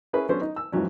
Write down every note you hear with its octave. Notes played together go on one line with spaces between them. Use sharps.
C#4 E4 G#4 A#4 B4
F#3 B3 C#4 D4 A4 C5
D#4
E6
F2 G#2 E3 F#3 C#4